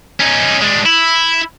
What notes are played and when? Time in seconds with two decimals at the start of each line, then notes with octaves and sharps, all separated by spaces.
0.20 C#4 D#4
0.62 G#3 D4
0.86 E4